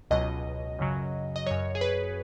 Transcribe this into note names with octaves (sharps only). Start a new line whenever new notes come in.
C#2 B2 F#3 D#5
F#2 C#3 F#3
D#5
F#2 F#3 C#5
G#4
B4